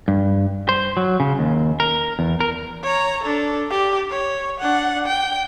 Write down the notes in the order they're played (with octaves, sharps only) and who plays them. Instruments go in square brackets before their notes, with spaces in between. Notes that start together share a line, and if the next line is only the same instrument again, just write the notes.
[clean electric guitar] G2
C5
F#3
C#3
D#2
A#4
E2
A#4
[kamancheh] C#5 A#5
D4 A4
G4
C#5
D4 F#5
G5